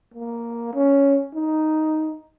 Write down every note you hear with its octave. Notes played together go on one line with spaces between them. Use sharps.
A#3
C#4
D#4